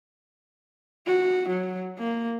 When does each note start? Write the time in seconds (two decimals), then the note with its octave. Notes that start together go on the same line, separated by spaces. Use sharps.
1.06 F#4
1.48 F#3
1.98 A#3